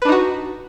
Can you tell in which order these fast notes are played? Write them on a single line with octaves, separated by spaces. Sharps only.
B4 D4 D#4 F#4